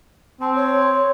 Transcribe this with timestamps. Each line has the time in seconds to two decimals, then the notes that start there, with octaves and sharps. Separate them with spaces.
0.41 C4 A5
0.55 C#5